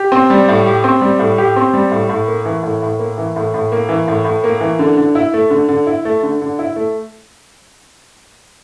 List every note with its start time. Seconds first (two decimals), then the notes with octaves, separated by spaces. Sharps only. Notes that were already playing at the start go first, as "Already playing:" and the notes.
Already playing: G4
0.12 C4
0.30 G3
0.48 A2
0.67 G4
0.84 C4
1.01 G3
1.19 A2
1.38 G4
1.56 C4
1.74 G3
1.91 A2
2.09 A2
2.28 A#3
2.45 E3
2.63 A2
2.82 A2
2.99 A#3
3.18 E3
3.36 A2
3.54 A2
3.72 A#3
3.89 E3
4.08 A2
4.25 A2
4.44 A#3
4.61 E3
4.79 D3
4.97 D3
5.15 E4
5.34 A3
5.50 D3
5.69 D3
5.87 E4
6.05 A3
6.23 D3
6.41 D3
6.59 E4
6.76 A3